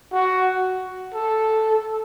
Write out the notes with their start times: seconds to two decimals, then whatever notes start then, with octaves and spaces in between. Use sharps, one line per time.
0.12 F#4
1.14 A4